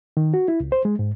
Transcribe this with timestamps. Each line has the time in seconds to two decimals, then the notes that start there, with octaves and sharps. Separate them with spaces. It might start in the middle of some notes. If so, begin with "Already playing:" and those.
0.17 D#3
0.34 F#4
0.48 E4
0.60 C#2
0.72 C5
0.85 G#3
0.99 G#2